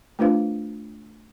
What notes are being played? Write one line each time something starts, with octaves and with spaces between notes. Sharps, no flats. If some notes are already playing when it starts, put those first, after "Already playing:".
A3 D4 F4 B4 C5 F5